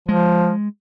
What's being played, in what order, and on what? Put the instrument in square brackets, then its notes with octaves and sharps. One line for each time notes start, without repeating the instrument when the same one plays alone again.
[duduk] F3 [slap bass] G#3